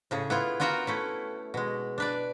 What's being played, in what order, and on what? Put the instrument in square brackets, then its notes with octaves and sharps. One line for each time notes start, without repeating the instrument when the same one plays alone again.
[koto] A2 C#3 G#4
B3 E4 F4
B3 F4 F#4 A#4 F#5 G5
A3 C#4 E4
B2 G#3
D4 B4 D5